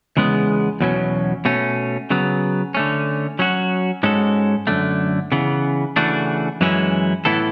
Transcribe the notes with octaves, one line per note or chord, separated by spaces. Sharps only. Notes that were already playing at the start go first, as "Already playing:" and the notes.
E2 C#3 G#3 B3
E2 B2 F#3 C#4
B2 A3 C#4
C#3 F#3 B3
D3 A3 C#4
F#3 C#4 F#4
G#2 G#3 C#4 F#4 A4
F#2 D3 A3
C#3 E3 B3
C#3 E3 A3 D4 F#4
F#2 E3 G#3 C#4 E4
A2 E3 B3 E4 A4